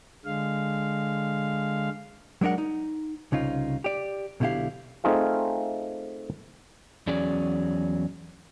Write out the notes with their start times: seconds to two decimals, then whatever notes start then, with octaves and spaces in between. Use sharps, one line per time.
0.25 D3 G#3 F5
2.41 F#3 G#3 D4 A#4 F#5
2.58 D#4
3.32 C2 C#3 D#4 F4
3.84 G4 D5
4.40 B1 B2 D3 E4 G4 F5
5.04 A3 C4 D#4 F4 G#4 F5
7.07 E2 F#3 C#4 G#4 D5